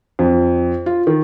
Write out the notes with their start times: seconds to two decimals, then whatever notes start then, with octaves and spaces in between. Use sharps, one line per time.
0.19 F2
0.86 F4
1.07 D#3